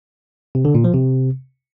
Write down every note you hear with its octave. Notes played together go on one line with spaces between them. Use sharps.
C3
D3
A#2
F3
C3